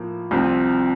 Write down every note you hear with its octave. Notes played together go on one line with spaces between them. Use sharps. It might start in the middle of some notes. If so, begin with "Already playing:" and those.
Already playing: A2 F3 A#3
C2 C3 F3 C4